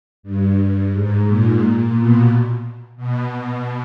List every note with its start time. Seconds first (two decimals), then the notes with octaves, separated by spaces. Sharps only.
0.23 G2
0.92 G#2
1.26 A#2
1.61 A#2
1.94 B2
2.97 B2